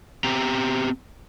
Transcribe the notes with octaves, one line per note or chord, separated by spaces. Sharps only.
B3 C4 G4 G5 A#5